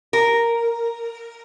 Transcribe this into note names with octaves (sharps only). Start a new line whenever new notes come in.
A#4